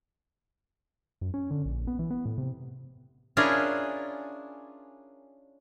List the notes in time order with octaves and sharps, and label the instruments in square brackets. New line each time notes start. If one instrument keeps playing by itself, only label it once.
[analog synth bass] F#2
C#4
D3
A#1
B3
E3
B3
A2
C3
[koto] C#4 D4 E4 F4 G#4 A#4